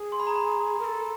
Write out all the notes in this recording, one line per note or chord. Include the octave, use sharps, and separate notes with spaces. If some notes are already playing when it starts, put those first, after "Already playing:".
Already playing: G#4
C6
B5
A#5
B5
A#4
A4